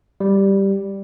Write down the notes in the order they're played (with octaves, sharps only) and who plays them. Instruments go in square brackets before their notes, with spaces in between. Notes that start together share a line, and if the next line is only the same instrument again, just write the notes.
[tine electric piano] G3